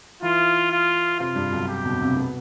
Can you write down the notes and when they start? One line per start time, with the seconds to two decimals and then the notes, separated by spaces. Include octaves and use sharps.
0.22 E3 E4 F4
0.71 F4
1.20 C3 C4 F4
1.35 G2 G3
1.52 B1 B2
1.68 G4
1.85 B1 B2
2.01 C2 C3
2.17 B2 B3